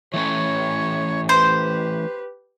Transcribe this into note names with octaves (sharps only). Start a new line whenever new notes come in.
E3 A3 C#4 C#5
G4 B4 C5